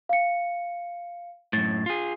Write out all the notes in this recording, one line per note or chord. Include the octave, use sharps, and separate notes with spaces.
F5 C#7
F#2 A2 A6
F4 G#4